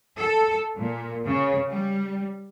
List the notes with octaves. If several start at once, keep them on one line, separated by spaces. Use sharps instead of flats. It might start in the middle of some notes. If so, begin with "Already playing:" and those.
A4
A#2
C#3
G3